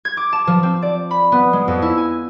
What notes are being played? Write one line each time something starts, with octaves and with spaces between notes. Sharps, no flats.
G#6
D6
A5
F3
C4
D5
B5
B3
G#3
F2
E4
G#5